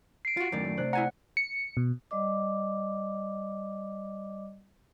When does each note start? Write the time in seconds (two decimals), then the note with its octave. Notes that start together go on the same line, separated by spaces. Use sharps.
0.25 C7 D7
0.37 F4 F#4
0.52 F#2 A2 D#3 D5
0.65 A3
0.77 C3 D4 F#6
0.93 E4 F#5 G#5 A#5
1.37 C#7
1.77 B2
2.11 G3 D5 D#5 D6